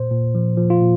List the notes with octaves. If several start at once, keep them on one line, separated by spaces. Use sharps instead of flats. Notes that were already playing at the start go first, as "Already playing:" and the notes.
Already playing: A#2 C5
A#2
F3
F3
F4
A#2